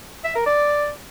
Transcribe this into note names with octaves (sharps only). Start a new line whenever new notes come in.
E5
A#4
D5